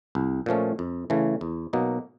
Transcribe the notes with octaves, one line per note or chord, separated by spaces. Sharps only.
C2
A#2 F3 A3 C#4
F2
C#3 E3 A3
E2
B2 F#3 A#3 D#4